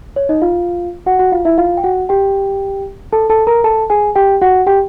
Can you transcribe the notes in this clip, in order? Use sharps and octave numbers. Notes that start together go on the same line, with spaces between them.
C#5
D#4 D#5
F4 F5
F#4 F#5
F#4 F#5
F4 F5
E4 E5
F4 F5
G5
F#4 F#5
G4 G5
A4 A5
A4 A5
A#4 A#5
A4 A5
G#4 G#5
G4 G5
F#4 F#5
G4 G5